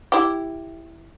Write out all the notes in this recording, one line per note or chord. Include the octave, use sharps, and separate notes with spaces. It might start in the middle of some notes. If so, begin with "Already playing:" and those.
E4 G4